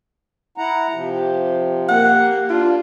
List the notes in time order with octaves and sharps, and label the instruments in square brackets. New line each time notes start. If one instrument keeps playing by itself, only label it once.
[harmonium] E4 F#5 A#5
[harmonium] C3 F3 [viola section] G4
[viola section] A#3 G4 [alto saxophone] F#5
[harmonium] D4 [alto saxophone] F4